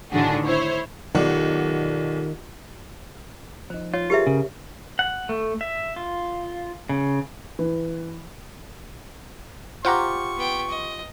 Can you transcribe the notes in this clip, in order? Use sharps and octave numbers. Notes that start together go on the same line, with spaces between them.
A2 D3 D#3 D4 F#4 G#4
E4 C5 C#5
B1 D#3 F4 G4 D5 F#5
F3 D#4 C5
F4 C#5
G4 G#4 A#4 B4 C#5 E5
C#3
F#5
A3
E5
F4
C#3
E3
F4 G4 C5 F#5 A#5 C#6
B3 G5
D#5